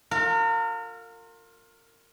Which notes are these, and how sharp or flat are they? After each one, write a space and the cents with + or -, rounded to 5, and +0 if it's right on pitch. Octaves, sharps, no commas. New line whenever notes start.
F4 +25 A#4 -35